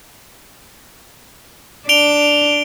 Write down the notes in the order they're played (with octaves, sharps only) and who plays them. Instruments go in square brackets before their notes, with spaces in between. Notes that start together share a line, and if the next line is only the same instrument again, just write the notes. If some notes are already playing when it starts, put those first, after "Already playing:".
[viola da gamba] D4 [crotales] D7 F7 G7